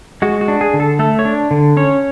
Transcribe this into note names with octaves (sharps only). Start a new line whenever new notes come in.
G#3 F#4
F#4
D4
G#4
D3
A4
A3 A4
C#5
D4
D3
C#4 C#5